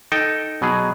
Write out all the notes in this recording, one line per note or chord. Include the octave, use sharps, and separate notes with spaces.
D#4 A4 G5
B2 F#3 G#4